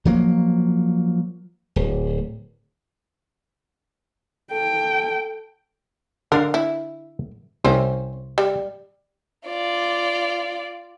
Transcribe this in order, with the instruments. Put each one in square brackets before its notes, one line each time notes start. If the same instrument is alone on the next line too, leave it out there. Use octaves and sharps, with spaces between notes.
[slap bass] F3 F#3 A#3
D1
[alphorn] A4 [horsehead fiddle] G5
[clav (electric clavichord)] D3 D4 F5 [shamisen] A#4
[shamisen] E4
[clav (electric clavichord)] C2 [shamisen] C4 C#4 C5
[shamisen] G3
[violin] F4 D5